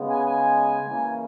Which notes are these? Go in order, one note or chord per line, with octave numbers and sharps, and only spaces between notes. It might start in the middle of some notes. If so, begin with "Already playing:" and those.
Already playing: C#3 G#3 B3
G#5
G#5
C#3 E3 A#3